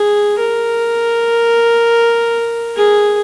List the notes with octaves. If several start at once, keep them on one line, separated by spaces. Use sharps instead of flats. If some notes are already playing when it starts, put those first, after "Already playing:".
Already playing: G#4
A#4
G#4